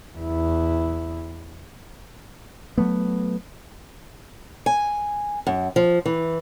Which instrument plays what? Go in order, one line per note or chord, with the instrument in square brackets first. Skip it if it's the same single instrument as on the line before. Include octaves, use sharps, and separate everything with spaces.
[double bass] E2 E4
[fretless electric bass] F#3 A3 B3
[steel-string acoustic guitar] G#5
F#2
F3
E3